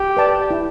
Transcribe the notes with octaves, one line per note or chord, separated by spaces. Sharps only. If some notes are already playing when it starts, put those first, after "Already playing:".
Already playing: G4
B4 D5 A5
E4